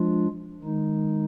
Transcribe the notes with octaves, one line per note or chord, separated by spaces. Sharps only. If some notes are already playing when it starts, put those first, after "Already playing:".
Already playing: F3 G#3 D4 F4
D#3 G#3 D#4